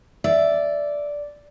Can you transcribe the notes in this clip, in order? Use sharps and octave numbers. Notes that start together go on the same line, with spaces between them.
D5 E5